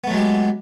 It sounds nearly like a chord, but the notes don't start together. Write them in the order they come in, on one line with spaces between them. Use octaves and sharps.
B3 A3 F#3 G#3 G4